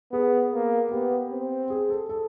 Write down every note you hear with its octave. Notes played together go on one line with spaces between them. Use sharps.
B3 G#4
A#3
B3 G4
C4
G#4
A4
A4